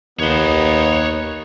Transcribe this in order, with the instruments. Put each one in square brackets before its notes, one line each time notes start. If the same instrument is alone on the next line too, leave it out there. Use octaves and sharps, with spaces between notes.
[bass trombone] D#2 [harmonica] B3 D#4 [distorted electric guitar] C#5 C6